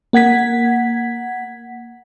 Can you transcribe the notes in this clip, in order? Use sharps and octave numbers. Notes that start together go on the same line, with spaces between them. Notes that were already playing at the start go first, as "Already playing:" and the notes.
A#3 F#5 G#6 B6